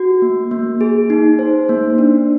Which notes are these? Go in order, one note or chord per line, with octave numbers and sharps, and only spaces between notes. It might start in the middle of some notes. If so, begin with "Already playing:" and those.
Already playing: F#4
A#3
A#3
G#4
D#4
C5
A#3
D4